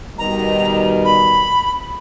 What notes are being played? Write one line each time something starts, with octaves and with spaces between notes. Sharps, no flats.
B2 D#3 G3 A#5
B5